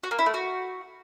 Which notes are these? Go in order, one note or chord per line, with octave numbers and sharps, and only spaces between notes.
F#4
A#3
E4
A3
F#4